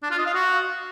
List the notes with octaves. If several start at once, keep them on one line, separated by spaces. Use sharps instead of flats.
D4
F4
D#5
F5
F#4